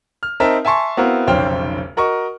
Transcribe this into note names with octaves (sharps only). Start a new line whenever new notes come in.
F6
C4 D#4 A#4 E5 A5
E5 G#5 A5 C6 C#6
B3 C4 E4 F#4 A#4 F5
F1 B1 C#3 C5 G5 F6
F#4 A#4 D#5 C#6